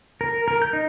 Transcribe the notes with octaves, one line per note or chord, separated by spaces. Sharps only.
A#4
A#4
G6
D#4